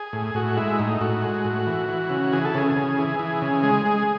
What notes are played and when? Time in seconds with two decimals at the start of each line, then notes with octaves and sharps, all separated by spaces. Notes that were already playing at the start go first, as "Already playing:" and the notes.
Already playing: G#4
0.13 A2
0.34 A2 F#4
0.57 G#3 E4
0.79 A2 D#4
1.01 A2 F#4
1.22 G#3
1.45 A2
1.67 E3
1.89 E3
2.10 C#3
2.33 E3 G#4
2.45 A4
2.55 C#3 G#4
2.75 C#3
2.98 E3
3.19 E3
3.42 C#3
3.63 G#3
3.85 G#3